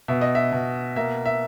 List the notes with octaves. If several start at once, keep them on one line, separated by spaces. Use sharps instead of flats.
B2 E5
D#5
E5
B2
A#3 E5
E5